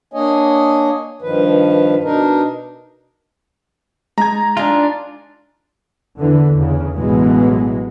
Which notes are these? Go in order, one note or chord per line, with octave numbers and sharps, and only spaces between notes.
A#3 D4 C#5 D#5 G#5
G2 D#3 F3 B4
B2 D4 D#4 A#4
G#3 D#4 A5 A#5 G#6
D4 D#4 F4 G#4 F5
E2 D3 E3
E2 C#3
A1 B2 E3 F#3 G#3 B3